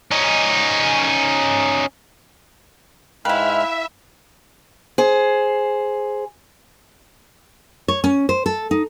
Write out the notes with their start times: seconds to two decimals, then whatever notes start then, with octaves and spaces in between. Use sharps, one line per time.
0.11 C#4 D#4
3.25 G#2 G#3 E4 B4 E5 F5 G5 F6
4.98 G#4 C5
7.88 C#5
8.04 C#4
8.29 C5
8.46 A4
8.71 D#4